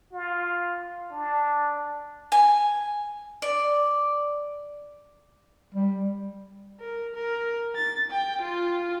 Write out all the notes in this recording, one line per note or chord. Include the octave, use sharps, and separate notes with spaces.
F4
D4
G#5
D5
G3
A#4
A#4
A6
G5
F4